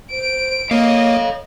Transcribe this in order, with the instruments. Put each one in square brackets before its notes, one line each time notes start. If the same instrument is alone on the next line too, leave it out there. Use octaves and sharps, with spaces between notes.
[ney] C5 [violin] D7
[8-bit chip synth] A#3 [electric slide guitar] A4 F5 [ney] C#5 [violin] D#5